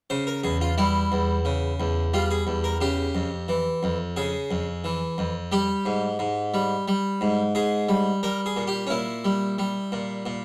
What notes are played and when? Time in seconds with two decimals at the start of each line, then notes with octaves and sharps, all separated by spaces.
0.10 C#3 C5
0.27 A#4
0.43 E2 G#4
0.61 F4
0.78 G3 E4
1.12 E2
1.45 C#3
1.80 E2
2.14 G3 F4
2.31 G#4
2.47 E2
2.64 A#4
2.81 C#3 G4
3.15 F2
3.48 E3
3.83 F2
4.16 C#3 G#4
4.51 F2
4.84 E3
5.18 F2
5.52 G3 G4
5.85 G#2
6.19 G#2
6.54 G3
6.88 G3
7.21 G#2
7.55 G#2 G#4
7.89 G3
8.23 G3 A#4
8.46 G#4
8.56 A#2
8.67 G4
8.87 C#4
8.90 A#2 E4
9.25 G3
9.58 G3
9.92 A#2
10.26 A#2